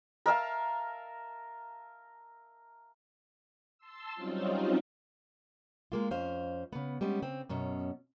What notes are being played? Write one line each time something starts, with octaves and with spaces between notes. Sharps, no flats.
A#4 E5 F5 A5
A5 C6 E6
F#3 G3 C4 C#4 D#4 F4
G#3 A#3 F4
F2 C#4 C5 F5
C#3 B3
G3 G#3 B3 C#4
C#3 C4
F#2 B2 C#4